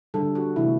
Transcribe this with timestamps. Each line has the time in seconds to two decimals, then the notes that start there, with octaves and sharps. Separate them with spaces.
0.14 D3 G3 A4
0.35 F#4
0.56 C3 E3 A3 E4